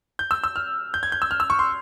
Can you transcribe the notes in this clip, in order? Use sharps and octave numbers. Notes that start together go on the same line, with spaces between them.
G6
E6
E6
F6
G6
G#6
G6
E6
F6
E6
C#6
C6